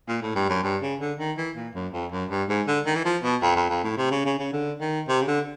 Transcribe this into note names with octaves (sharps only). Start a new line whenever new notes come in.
A#2
A2
G2
F#2
G2
C#3
D3
D#3
E3
A#2
F#2
F2
F#2
G2
G#2
D3
D#3
E3
F3
B2
F2
F2
F2
A2
C3
C#3
C#3
C#3
D3
D#3
C3
C#3
D3